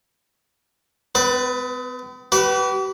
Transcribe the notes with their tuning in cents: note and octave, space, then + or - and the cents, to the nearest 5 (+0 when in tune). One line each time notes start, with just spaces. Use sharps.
B3 +45 B4 +0
G4 -45 B4 +0